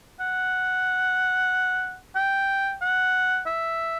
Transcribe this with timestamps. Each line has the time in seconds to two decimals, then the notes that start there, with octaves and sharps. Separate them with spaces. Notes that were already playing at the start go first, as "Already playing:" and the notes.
0.20 F#5
2.15 G5
2.82 F#5
3.46 E5